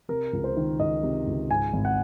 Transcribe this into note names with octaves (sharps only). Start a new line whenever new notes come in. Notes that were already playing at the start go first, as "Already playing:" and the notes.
C3 A#4
C#2
C5
D#3
C#2 D#5
C3
C#2
G#2 G#5
G#1
F#5